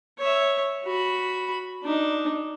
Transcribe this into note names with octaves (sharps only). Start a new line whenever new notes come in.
C#5 E5
F#4 B5
D4 D#4